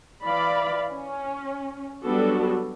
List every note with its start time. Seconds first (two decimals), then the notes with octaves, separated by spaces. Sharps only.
0.25 E3 D5 F5 B5
0.90 C#4
2.03 F#3 G3 B3 D4 F#4 A4